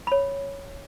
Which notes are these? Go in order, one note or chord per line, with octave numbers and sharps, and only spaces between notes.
C#5 B5